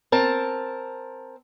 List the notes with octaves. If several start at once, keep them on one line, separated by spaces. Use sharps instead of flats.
C4 A#4 A5